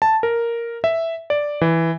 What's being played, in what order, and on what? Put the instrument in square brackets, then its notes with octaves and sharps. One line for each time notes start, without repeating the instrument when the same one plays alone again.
[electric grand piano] A5
A#4
E5
D5
E3